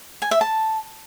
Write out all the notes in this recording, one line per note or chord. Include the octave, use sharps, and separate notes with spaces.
G#5
E5
A5